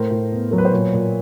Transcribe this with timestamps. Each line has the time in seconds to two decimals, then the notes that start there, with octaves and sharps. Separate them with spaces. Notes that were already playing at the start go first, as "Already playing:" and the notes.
Already playing: A2 A#4 C5
0.11 A2
0.32 B3
0.51 F#3 A#4
0.58 B4
0.65 C5
0.72 A#2 B4 C#5
0.94 A#2